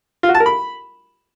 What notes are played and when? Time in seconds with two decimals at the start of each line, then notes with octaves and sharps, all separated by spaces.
0.23 F4
0.29 F#4
0.35 A5
0.40 A#4
0.46 B5